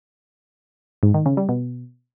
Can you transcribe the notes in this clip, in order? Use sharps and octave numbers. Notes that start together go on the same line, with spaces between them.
G#2
D#3
C#3
G3
B2